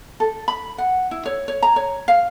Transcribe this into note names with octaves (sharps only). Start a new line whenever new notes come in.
A4
B5
F#5
E4
C#5
C#5
A#5
C#5
F5